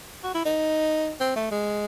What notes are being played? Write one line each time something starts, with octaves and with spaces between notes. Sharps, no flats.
F#4
E4
D#4
C4
A3
G#3